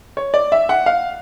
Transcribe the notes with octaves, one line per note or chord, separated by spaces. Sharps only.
C#5
D5
E5
F#5
F5